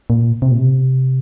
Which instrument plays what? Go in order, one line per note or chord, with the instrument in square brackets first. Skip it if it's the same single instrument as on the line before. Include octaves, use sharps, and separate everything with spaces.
[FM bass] A#2
C3
A#2
C3